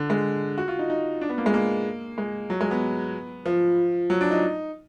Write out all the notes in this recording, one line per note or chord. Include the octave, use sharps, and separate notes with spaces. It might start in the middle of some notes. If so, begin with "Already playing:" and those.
Already playing: D3
G#3
F#4
F4
D#4
D#4
D4
B3
A#3
G#3
A#3
G#3
F#3
G#3
B3
F3
F#3
D4
D#4